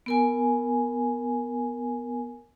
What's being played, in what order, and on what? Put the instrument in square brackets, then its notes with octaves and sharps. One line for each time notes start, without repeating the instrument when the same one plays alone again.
[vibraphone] B3 A#4 G#5